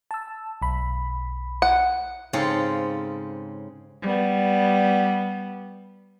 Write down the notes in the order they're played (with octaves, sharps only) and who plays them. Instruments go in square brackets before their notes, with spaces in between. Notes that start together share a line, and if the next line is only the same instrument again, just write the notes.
[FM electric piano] A5 E6
B1 B5
[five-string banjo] F#5
[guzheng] G#2 C#3 C4 A4 F5
[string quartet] G3 B3